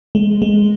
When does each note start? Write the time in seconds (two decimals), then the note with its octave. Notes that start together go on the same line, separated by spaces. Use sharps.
0.15 G#3
0.42 G#3